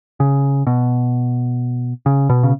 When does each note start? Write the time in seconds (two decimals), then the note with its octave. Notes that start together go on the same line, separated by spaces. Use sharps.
0.20 C#3
0.67 B2
2.06 C#3
2.29 B2
2.43 C#3